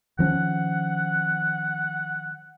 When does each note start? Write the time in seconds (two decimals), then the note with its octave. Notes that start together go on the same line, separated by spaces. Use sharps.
0.19 D#3 F3 C#4 F#5